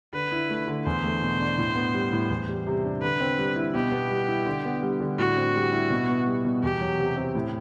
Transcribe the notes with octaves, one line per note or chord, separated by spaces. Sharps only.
D3 B4
E4
A3
D3
E2 C5
A3
B2
D4
A2
B3
G3
A2
E2
G3
C3
D4
D3 B4
C4
G3
E4
B2 G4
B3
G3
E4
D3
B3
G3
D3
A2 F#4
C4
G3
E4
B2
B3
G3
B2
E2 G4
F#3
C3
C4
A2